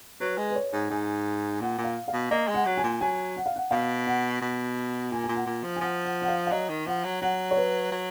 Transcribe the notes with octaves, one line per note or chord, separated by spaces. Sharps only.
F#3 B4
G#3
B4
C#5
G#2
G#2 G#5
A#2 F#5
A#2
F5
F5
B2
A#3 D#5
G#3
F#5
F#3
G#5
A#2
F#3 G#5
F#5
F5
F#5
B2 F5
F#5
B2
A#2 G#5
A#2 G#5
F#5
A#2
F3
G#5
F3 F#5
F#5
F#5
F5
F5
F#3 D#5
D#3
F3 F#5
F#3
F#3 F#5
C#5
B4
F#3